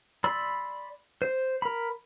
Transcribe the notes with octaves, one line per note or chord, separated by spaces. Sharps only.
D5 B5 C6 E6
C5
A#4 B5